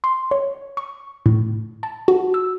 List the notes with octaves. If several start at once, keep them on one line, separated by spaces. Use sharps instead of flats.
C6
C#5
C#6
A2
A5
F#4
E6